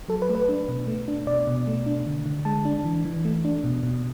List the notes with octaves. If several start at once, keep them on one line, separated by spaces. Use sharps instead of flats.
F#3 A4
B4
A3
B4
D4
B2
A3
D4
B2 D5
B2
A3
D4
D3
D3
G#3 A5
D4
E3
E3
A3
D4
B2
B2